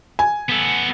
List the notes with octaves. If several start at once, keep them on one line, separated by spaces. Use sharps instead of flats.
G#5
B3 A4